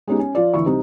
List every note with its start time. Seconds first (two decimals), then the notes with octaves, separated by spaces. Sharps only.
0.07 G#3 B3 C#4 D#4 G4
0.19 C#4
0.35 F3 F4 D5
0.54 D2 E3 E4 C#6
0.66 C3 G3 C4 D#4